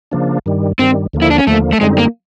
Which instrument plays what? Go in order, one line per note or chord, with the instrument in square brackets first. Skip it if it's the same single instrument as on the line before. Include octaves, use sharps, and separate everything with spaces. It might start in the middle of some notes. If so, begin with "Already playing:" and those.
[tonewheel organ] C#3 F3 A#3 D4
G2 D#3 G3
[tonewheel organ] G2 D#3 G3 [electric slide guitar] C4
[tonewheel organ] D#2 D3 F3 A#3
[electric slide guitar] E4
D4
C#4
[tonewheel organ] D#2 D3 F3 A#3 [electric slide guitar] A3
[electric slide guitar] A3
[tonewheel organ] F#2 D3 G3 C4 D#4 [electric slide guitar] G#3
[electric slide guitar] A#3